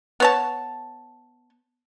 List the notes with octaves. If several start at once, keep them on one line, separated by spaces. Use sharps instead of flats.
B3 C#5 A5